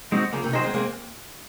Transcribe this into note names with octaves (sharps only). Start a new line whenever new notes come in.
G#3 C4 D#4 F#4
C#3 F3 A#3
C3 D#3
D#3 F#3 D#4 G#4 C5
G#3 C4
G#3 A#3 C4